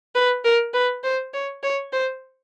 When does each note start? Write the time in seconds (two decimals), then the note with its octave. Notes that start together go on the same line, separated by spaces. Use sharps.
0.15 B4
0.44 A#4
0.74 B4
1.04 C5
1.34 C#5
1.63 C#5
1.93 C5